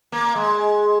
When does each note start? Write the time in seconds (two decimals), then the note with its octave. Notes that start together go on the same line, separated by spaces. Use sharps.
0.12 A#3
0.35 G#3